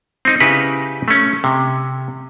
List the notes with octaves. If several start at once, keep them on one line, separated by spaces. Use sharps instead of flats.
C4 D#4
C#3 D#4 E4 G4 B4
A3 C#4
C3